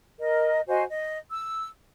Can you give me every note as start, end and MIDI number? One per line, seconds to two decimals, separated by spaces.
0.19 0.60 70
0.19 0.60 75
0.68 0.83 66
0.68 0.83 72
0.68 0.83 75
0.68 0.83 80
0.88 1.18 75
1.31 1.68 88